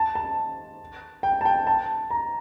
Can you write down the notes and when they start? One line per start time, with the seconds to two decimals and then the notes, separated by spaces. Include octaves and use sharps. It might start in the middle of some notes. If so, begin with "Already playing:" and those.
Already playing: A5
0.15 A5
1.23 G5
1.41 A5
1.45 G5
1.67 A5
2.10 A#5